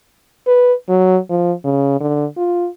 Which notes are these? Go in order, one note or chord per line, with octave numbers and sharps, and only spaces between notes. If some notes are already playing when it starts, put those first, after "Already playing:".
B4
F#3
F3
C#3
D3
F4